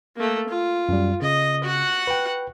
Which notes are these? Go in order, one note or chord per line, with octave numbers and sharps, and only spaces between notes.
A3 A#3
F4
F#2 G3
C#3 D#5
F#4 F#5
B4 G5